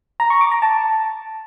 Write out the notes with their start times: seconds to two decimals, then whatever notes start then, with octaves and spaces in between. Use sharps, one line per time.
0.20 A#5
0.30 C#6
0.41 D6
0.52 A#5
0.62 A5